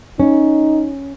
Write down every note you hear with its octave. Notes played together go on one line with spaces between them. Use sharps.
C#4 D#4